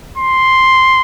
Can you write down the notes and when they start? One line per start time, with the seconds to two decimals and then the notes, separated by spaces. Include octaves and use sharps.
0.18 C6